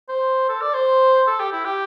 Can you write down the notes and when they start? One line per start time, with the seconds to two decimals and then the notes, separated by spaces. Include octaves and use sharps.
0.09 C5
0.49 A4
0.61 D5
0.74 C5
1.27 A4
1.40 G4
1.52 E4
1.65 G4